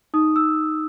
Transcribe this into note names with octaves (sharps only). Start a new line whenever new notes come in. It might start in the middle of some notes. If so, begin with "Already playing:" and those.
D#4 D#6
E6